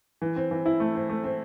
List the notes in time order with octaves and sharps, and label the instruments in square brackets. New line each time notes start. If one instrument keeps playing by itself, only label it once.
[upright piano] E3
C4
E3
E4
A3
C4
A3
C4